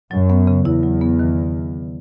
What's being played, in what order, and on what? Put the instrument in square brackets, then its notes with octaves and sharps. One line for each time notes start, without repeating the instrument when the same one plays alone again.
[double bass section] F#2 [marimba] F#3
[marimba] B3
C#3
[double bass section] E2 [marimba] E4
[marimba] F#3
B3
D#3